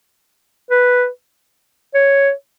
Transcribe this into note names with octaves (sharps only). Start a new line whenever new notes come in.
B4
C#5